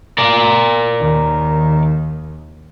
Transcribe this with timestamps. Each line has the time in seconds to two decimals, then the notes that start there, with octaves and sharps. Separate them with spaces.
0.18 A#4 D5
1.00 D#2 D#3